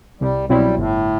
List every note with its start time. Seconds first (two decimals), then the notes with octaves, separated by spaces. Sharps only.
0.21 C2 G3
0.49 B2 F#3 G3 C4 E4
0.78 G1 A2